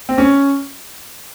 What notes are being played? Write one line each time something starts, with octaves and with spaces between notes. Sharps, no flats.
C4
C#4